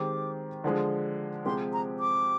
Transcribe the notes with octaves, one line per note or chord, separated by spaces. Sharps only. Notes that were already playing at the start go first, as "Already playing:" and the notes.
Already playing: D#3 G#3 C4 G4 D6
D3 F3 G#3
C3 F3 G#3 C4 G4 C6
A#5
D6